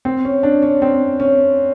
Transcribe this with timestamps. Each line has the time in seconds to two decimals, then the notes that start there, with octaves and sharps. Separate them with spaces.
0.05 C4
0.25 C#4
0.43 D4
0.62 C#4
0.82 C4
1.20 C#4